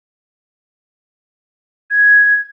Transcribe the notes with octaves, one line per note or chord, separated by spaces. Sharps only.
G#6